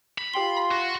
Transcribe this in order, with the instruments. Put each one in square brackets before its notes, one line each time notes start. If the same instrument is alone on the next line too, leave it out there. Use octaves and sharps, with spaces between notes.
[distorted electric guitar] B5
[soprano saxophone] F4 [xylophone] G4 G5 G7 [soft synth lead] C6
[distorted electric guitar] F#4